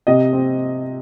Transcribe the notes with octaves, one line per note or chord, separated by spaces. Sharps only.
C3 D#5
C4